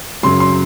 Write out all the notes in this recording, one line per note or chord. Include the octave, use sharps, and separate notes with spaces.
F#2 C#3 F#3 C6
C6